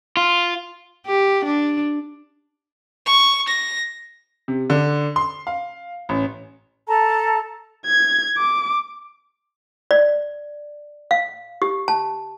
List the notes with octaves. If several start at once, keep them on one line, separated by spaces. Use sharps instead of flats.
F4
G4
D4
C#6
A#6
C3
D3
C6
F5
A1
A4 A5 A#5
G#6
D6
D5
F5
G4
A5